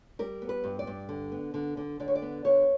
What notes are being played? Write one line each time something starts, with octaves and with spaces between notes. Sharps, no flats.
G3 A#4
B3
B4
G2
D5
G2
D3
B3
D3
D3
D3 D5
C#5
D5
B3
D3 C#5